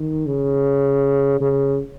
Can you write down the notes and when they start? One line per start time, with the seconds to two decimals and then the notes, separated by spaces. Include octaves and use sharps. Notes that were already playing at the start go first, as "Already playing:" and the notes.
Already playing: D#3
0.26 C#3
1.41 C#3